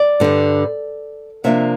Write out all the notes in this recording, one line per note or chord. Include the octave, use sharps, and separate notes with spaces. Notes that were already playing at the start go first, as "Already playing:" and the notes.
Already playing: D5
G2 D3 G3
C3 F3 A#3 D4 E5